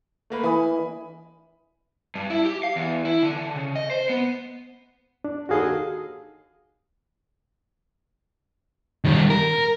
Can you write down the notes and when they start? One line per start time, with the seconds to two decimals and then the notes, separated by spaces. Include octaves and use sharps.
0.30 A3 A#3 B4
0.44 E3 G#5 B5 D#6
2.15 G2
2.30 E4
2.45 G4
2.63 F5
2.76 E2
3.05 E4
3.23 D3
3.37 D3
3.56 C#3
3.76 D#5
3.90 C5
4.10 B3
5.24 D4
5.49 D#2 F#4 G#4 A4 D#5 F5
9.05 D#3 G3
9.30 A#4